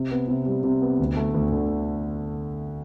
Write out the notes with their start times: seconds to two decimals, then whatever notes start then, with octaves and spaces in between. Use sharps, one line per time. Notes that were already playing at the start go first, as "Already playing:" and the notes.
Already playing: C3
0.11 B3
0.28 C3
0.46 G3
0.64 C3
0.82 B3
0.99 D2
1.16 A3
1.34 D2
1.52 D3